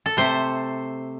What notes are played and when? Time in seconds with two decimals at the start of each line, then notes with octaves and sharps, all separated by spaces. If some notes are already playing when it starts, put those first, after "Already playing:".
0.06 A4
0.17 C3 A3 C5